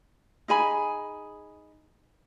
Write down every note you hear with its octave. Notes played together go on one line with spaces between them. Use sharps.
D#4 G#4 G#5 B5